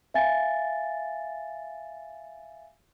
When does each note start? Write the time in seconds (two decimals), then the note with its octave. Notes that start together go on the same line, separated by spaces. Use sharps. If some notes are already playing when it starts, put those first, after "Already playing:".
0.14 E5 F5 G#5 A6